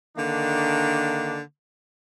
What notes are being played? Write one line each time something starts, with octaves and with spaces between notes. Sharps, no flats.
D3 D#3 A#3 D4